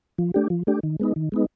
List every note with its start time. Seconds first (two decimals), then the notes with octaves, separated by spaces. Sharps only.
0.18 F3
0.34 A3 D4 G4
0.50 F3
0.67 A3 D4 G4
0.83 D#3
1.00 G#3 B3 D#4
1.16 D#3
1.32 G#3 B3 D#4